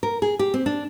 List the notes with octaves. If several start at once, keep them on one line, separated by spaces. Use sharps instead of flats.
A#4
G#4
G4
C4
D4